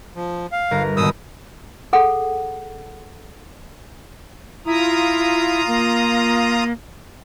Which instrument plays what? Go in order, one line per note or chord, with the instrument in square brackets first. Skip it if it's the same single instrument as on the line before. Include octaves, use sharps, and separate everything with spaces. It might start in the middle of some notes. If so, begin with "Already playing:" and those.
[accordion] F3
F5
[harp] G1 A#4
[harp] G#1 [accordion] B2 D#6 E6
[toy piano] G#4 A4 F#5
[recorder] E4 [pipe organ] F4 A#5 D#6
[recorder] A#3